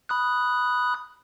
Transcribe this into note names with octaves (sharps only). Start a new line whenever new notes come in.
B5 D#6 F#6